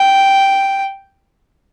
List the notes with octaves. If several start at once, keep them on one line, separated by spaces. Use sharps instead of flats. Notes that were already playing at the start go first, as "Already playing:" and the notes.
Already playing: G5